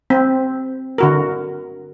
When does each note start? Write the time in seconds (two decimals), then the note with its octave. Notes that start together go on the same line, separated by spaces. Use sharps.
0.10 C4
0.98 D3 F#4 A#4